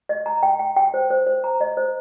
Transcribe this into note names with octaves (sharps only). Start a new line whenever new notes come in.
D#5
A#5
G5
G5
G5
C5
C5
C5
A#5
D#5
C5